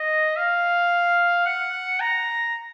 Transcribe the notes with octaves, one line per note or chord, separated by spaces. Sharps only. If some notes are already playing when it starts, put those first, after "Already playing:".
Already playing: D#5
F5
F#5
A#5